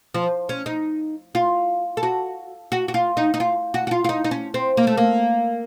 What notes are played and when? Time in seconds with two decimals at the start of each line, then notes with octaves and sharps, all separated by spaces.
0.14 F3
0.49 C#4
0.66 D#4
1.35 F4
1.97 A4
2.03 F#4
2.72 F#4
2.88 F#4
2.94 F4
3.17 D#4
3.34 D#4
3.40 F4
3.74 F#4
3.87 F#4
3.91 F4
4.04 F4
4.09 D#4
4.24 D#4
4.31 C#4
4.54 C4
4.77 A#3
4.87 A3
4.97 A#3